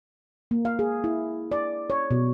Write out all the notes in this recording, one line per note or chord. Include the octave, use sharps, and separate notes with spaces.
A#3
F5
G#4
E4
D5
C#5
B2